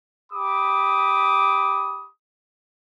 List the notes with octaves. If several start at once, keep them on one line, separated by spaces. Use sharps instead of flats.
G4 B5 D6 D#6